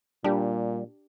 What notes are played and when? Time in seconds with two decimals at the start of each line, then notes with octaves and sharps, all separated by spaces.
0.24 A#2 G3 D4 G4